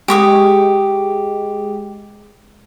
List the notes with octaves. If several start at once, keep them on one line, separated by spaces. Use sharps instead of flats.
G#3 G4 C#6 D#6